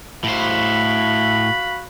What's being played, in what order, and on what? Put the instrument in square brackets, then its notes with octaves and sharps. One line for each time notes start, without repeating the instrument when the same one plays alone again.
[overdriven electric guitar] A2 C5 [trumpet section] F#4 F5 B5